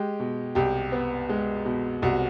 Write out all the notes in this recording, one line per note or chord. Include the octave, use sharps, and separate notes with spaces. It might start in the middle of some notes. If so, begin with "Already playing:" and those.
Already playing: G#3 G4
B2
C2 G4
B3
G#3
B2
C2 F#4